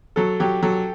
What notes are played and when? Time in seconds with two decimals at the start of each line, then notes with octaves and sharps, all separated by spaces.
0.16 F#3 A4
0.40 F#3 G4
0.62 F#3 A4